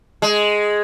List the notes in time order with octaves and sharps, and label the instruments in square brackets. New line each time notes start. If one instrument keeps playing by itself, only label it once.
[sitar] G#3